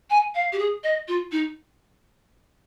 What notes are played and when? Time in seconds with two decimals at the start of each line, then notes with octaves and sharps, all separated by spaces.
0.10 G#5
0.34 F5
0.52 G4
0.58 G#4
0.83 D#5
1.08 F4
1.31 D#4